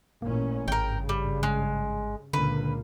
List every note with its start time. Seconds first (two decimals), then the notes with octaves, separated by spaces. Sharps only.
0.22 A1 A#2 A#3 C#4
0.68 G#1 G2 C#3 A#4 G5
1.09 G3
1.43 G#3
2.33 C#2 A#2 D3 A#3 B4